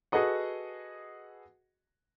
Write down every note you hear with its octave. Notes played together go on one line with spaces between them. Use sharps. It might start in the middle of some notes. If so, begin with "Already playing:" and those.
F#4 G#4 A4 B4 D#5 F#5